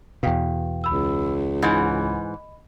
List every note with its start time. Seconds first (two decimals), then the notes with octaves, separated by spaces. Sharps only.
0.23 E2 B2 F5 G5
0.84 C#2 B5 E6
1.62 G#2 E3 D#5 B5